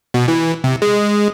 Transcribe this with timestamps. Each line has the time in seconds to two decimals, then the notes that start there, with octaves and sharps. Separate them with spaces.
0.14 B2
0.28 E3
0.64 C3
0.82 G#3